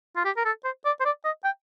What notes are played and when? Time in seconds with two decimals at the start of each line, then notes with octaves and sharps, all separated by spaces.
0.16 F4
0.25 G4
0.36 A#4
0.45 A4
0.64 C5
0.85 D5
1.00 C5
1.05 D5
1.24 D#5
1.44 G5